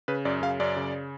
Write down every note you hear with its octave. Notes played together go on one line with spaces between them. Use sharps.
C#3 B4
F#2 D5
C#3 F5
F#2 D5
C#3